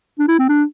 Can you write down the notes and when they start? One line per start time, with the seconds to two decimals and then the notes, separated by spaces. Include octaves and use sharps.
0.19 D4
0.28 E4
0.39 C4
0.49 D4